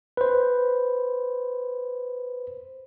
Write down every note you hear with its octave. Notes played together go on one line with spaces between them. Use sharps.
B4 C5